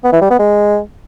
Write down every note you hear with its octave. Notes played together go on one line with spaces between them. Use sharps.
B3
E3
G3
B3
G#3